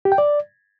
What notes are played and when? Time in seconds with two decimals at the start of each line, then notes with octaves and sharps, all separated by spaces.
0.05 G4
0.12 G5
0.18 D5